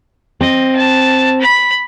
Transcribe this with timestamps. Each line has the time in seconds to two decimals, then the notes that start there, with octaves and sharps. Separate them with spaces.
0.41 C4 D#5
0.75 A5
1.40 B5